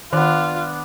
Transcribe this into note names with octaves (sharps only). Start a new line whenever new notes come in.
D#3 B3 D4 F4